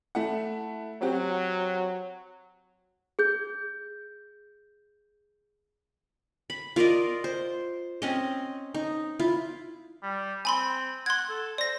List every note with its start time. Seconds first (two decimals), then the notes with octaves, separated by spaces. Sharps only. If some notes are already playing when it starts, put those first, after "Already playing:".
0.15 A3 E4 F#5
1.02 F#3 C4 F#4 G4
3.19 G#4 G6
6.50 B5
6.76 F4 A#4 D5 D#5
7.24 C5
8.02 C4 C#4 D#5
8.74 D#4
9.19 E4 F4
10.03 G3
10.45 C4 G#5 B5 C6
11.06 F#5 C6 G#6
11.29 A4
11.58 C5 D5 A#6